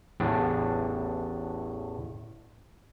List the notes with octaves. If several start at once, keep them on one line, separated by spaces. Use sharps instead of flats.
A1 E2 A2 D4